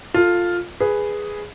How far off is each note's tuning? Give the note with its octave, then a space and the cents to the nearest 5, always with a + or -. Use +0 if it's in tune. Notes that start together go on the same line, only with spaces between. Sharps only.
F4 +5 A4 +15
G#4 +0 B4 +0